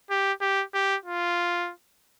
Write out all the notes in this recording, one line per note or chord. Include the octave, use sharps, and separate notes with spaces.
G4
G4
G4
F4